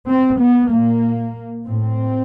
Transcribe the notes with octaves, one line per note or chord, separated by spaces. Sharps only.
C4
B3
A#2 A#3
A2 C4